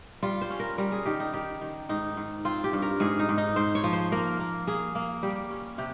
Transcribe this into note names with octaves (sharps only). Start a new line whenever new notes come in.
G3 F4
C5
C#4
A#4
G3 A#4
G#4
D#3 G4
D#4
D#3 G4
D#3
G#2 D#4
G#2
C4 F4
G4
G2
A#4
G#2 G#4
D#4
G#2
D#4
G#2 C5
C#5
F3
C5
A#3 A#4
A#3
A#3 G#4
A#3
G3 G4
C#4
C3 G4